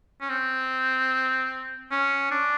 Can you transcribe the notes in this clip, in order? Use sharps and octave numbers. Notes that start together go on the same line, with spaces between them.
C#4
C4
C#4
D4